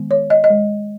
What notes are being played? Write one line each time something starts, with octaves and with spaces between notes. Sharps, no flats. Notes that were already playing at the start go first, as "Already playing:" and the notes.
Already playing: D#3 G#3 B3
C#5
D#5
D#5
G#3